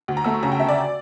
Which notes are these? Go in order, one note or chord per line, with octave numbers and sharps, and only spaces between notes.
D2
A#5
A3 E6
C#6
C#3 A#5
G5
D2 E5
D5